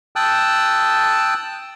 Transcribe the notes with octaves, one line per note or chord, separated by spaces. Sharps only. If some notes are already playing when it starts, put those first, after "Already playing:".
G5 A5 D#6 E6 F#6